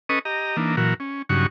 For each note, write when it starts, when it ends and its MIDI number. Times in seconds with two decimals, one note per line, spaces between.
0.09 0.19 61
0.09 0.19 69
0.09 0.19 71
0.09 0.19 75
0.09 0.19 85
0.09 0.19 87
0.25 0.56 67
0.25 0.56 75
0.25 0.56 82
0.57 0.76 52
0.57 0.76 58
0.57 0.76 62
0.57 0.76 63
0.77 0.94 46
0.77 0.94 52
0.77 0.94 54
0.77 0.94 66
0.77 0.94 70
1.00 1.22 61
1.29 1.46 43
1.29 1.46 49
1.29 1.46 54
1.29 1.46 63
1.29 1.46 66
1.29 1.46 85